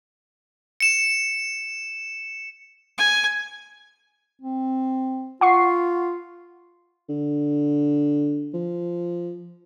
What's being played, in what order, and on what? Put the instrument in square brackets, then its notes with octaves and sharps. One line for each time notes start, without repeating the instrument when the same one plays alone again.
[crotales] C#7 E7
[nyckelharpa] G#5
[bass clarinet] C4
[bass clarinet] F4 [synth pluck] F#5 C#6 C7
[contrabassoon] D3
F3